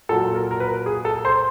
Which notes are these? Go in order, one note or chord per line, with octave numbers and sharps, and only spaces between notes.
A#2 F#3 A4
A#4
A#4
B4
G#4
A4
C5